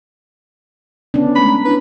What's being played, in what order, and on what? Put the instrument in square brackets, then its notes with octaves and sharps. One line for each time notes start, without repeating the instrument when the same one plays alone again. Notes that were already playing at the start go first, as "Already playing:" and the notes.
[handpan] B3 C#4 D4
[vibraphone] G#3 A3 [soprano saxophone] B5
[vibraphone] A#5
[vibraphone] D4 E4 [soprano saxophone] B4